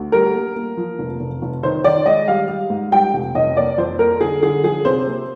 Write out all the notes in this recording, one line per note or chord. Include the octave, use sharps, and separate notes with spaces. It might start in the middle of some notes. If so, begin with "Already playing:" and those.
Already playing: D2
G3 A#4
A#3
A#3
F3
F1
F1
F1
D#3 C5
D#3 D5
G#3 D#5
G3 F5
G3
G#2
G3 G5
F1
F1 D#5
A#3 D5
F2 C5
A#3 A#4
D3 G#4
D3 G#4
F3 G#4
C3 C5
A#3